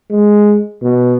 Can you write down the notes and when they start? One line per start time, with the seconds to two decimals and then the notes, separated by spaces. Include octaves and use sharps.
0.10 G#3
0.83 B2